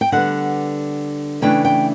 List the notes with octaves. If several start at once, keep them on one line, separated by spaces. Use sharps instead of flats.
G5
D3 G3 B3 F#5
C#3 E3 A3 D4 G5
G5